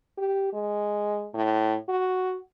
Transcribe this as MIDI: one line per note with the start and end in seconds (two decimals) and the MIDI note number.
0.18 0.49 67
0.53 1.28 56
1.35 1.76 45
1.89 2.38 66